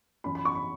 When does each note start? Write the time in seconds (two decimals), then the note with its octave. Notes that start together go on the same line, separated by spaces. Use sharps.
0.24 F#2 E3 C#4 E4 B5
0.35 B5
0.45 C#6
0.55 B5